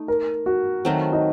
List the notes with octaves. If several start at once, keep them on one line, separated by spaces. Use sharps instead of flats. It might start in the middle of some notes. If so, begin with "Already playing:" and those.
Already playing: A3 D#4
A#4
F#4
D#3 F#3 A3 C4
D#4